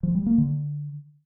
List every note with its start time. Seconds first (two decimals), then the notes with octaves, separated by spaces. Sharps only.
0.03 F3
0.15 G3
0.26 A#3
0.38 D3